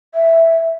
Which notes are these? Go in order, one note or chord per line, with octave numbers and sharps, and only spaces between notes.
E5